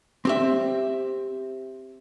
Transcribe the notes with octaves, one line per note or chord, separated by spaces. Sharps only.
C4 G4 E5